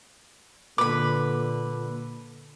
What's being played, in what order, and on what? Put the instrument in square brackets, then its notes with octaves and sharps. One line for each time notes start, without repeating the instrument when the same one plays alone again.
[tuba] A#2 [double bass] D3 [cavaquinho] B4 B5 [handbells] D6